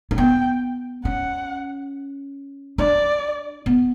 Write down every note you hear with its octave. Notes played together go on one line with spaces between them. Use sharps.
C#4
B3 G5
C#4 F#5
D4 D5
B3